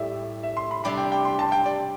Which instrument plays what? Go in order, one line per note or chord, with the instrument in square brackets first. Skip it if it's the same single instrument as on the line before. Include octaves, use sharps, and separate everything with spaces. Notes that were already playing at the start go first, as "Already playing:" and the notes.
Already playing: [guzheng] A2 G3 E4 G4 [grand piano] E5
[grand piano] E5
C6
B5
[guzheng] C3 G3 D4 G4 [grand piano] B5
[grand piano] G5
G5
C6
A5
G5
D5